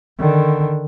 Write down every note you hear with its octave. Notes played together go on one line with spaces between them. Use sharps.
D3 D#3